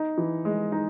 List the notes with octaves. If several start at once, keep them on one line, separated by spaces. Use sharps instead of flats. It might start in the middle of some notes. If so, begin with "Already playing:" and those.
Already playing: D#4
E3
G#3
D#4